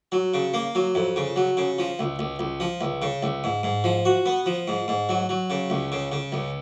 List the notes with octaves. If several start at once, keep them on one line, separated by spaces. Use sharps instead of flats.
F#3
C#3
A#3
F#3
F2
C#3
F#3
C#3
F3
C#2
C#2
C#2
F3
C#2
C#3
C#2
G#2
G#2
F3
F#4
B3
F3
G#2
G#2
F#3
F#3
C#3
C#2
C#3
C#3
C#2